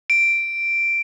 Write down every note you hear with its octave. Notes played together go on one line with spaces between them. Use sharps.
D7